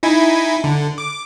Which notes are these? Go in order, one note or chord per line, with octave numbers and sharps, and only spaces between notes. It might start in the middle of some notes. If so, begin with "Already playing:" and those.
D#4 E4 G#5
D3
D6